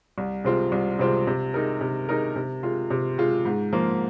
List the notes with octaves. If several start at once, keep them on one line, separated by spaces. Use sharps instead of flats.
C2
C3 G#3 C4 F4
C2
C3 G#3 C4 F4
C3
G#3 D#4 A#4
C3
G#3 D#4 A#4
C3
G#3 F4
C3
G#3 F4
G#2
F3 A#3